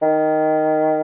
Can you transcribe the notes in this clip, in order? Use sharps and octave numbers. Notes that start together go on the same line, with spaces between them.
D#3